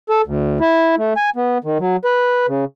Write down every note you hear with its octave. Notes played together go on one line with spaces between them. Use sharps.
A4
D2
E4
A3
G#5
B3
D#3
F#3
B4
C#3